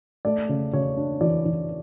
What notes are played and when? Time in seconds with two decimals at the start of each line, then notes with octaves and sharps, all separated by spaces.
0.25 A3 D5
0.49 C#3
0.73 C#3 C#5
0.97 D4
1.21 E3 D5
1.46 E3